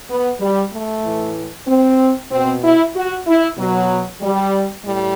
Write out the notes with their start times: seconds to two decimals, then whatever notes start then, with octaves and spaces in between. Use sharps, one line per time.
0.08 B3
0.40 G3
0.72 A3
1.03 A2 E3
1.67 C4
2.31 B2 C4
2.62 E4
2.95 F#4
3.27 E4
3.57 B2 F#3
4.21 G3
4.85 A2 G3